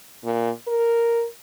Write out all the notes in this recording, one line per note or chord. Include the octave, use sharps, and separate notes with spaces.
A#2
A#4